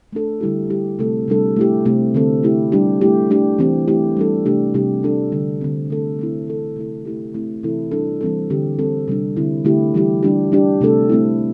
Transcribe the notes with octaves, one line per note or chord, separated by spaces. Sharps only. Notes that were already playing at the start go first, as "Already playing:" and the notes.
A3 D4 A4
D3 G3 E4 G4
G3 E4 G4
C3 A3 C4 A4
C3 G3 D4 A4
A3 E4 G4
C3 A3 C4 G4
D3 C4 A4
A3 E4 G4
G3 D4 G4
A3 E4 G4
A3 D4 G4
E3 C4 G4
A3 E4 G4
G3 D4 A4
C3 A3 D4 G4
C3 G3 D4 G4
G3 D4 A4
D3 G3 D4
D3 G3 C4
D3 A3 D4 A4
A3 C4 E4
E3 C4 A4
C3 A3 E4 A4
A3 E4 G4
A3 C4 E4
C3 E3 C4 E4 A4
G3 D4 A4
E3 G3 C4 A4
D3 C4 G4
G3 C4 A4
C3 G3 D4
D3 C4 E4
D3 A3 E4 G4
E3 G3 E4 G4
G3 D4 G4
G3 D4 G4
C3 A3 D4 A4
A3 C4 E4